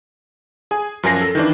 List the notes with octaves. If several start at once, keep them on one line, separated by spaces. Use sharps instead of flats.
G#4 G#5
F#2 F3 A#4 G#5 A#6 C7
A4
D#3 E3 D4